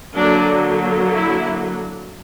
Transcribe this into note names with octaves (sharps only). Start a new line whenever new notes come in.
D3 F#3 A#3 D4
E4